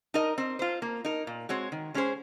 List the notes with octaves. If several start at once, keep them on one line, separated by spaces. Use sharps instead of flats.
D#4 A#4 D#5
C4
F4 C5
A#3
D#4 A#4
A#2
G#3 C4 F#4 C#5
D#3
G#3 C#4 G#4 C5